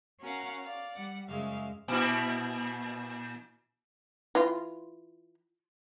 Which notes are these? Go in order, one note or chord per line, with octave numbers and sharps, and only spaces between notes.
C#4 F#4 A#4 F5 F#5
D5 F5
G3 F#5
F#2 C#3 G#3 E5 F5
A#2 E4
E3 F4